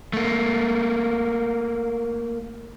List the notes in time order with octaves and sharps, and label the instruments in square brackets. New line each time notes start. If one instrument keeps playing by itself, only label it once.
[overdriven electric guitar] A3 A#3